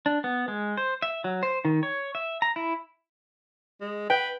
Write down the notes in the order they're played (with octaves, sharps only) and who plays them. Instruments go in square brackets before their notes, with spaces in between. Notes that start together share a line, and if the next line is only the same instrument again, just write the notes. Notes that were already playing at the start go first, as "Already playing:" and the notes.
[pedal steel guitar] D4
B3
G#3
C5
E5
F#3
C5
D#3
C#5
E5
A#5
E4
[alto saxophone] G#3
[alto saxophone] B4 [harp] G5